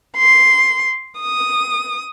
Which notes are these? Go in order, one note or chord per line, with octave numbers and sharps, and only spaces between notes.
C6
D#6